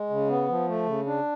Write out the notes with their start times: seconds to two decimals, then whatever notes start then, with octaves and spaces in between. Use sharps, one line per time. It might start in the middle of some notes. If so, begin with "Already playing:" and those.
Already playing: G#3
0.10 C#3
0.28 B3
0.48 F3
0.67 A3
0.86 C#3
1.06 D4